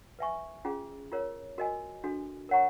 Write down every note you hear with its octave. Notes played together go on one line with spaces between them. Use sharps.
B4 E5 G#5 C#6
C#4 F4 G#4
F4 A#4 C#5
F#4 A#4 D#5 G#5
D4 F#4 A4
A#4 C#5 F#5 A#5 C#6